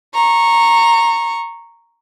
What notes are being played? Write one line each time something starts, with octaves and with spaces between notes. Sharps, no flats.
A#5 C#6